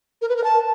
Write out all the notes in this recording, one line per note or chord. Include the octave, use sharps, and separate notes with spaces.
A#4
B4
A#4
A5